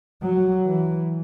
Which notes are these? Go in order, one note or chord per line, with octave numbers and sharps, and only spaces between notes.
F#3
E3